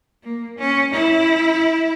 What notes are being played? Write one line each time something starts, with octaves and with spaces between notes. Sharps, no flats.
A#3
C#4
E4